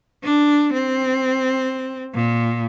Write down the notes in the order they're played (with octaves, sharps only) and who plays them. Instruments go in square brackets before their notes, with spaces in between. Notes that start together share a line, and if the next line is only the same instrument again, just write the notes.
[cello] D4
C4
A#2